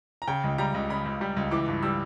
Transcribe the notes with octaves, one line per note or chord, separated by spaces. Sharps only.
A#5
C#3 G5
C#2
G3 A#5
C#2
C#3 B5
C#2
G3
C#2
E3 D6
G2
G3 E6